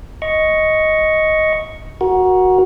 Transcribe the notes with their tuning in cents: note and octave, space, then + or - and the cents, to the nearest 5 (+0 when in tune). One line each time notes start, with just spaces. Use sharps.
D#5 +10 C#6 +0
F#4 +0 A#4 +20